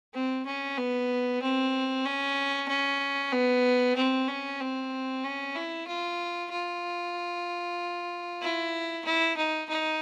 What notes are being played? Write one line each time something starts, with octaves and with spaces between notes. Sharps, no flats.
C4
C#4
B3
C4
C#4
C#4
B3
C4
C#4
C4
C#4
E4
F4
F4
E4
E4
D#4
D#4